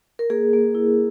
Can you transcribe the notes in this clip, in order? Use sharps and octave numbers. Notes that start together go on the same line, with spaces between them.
A#4
A#3 G#4
A#3
E4